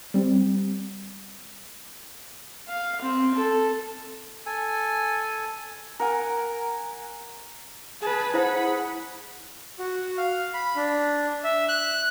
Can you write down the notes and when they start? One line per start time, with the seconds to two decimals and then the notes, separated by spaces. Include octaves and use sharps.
0.14 G3 C4
2.68 F5
3.02 C4
3.35 A4
4.46 A4 G#5
6.00 A#4 F#5 G#5
8.02 G#4 B4 A5
8.34 E4 C5 D#5 F#5 B5
9.79 F#4
10.18 F5
10.54 B5
10.76 D4
11.44 E5
11.69 F#6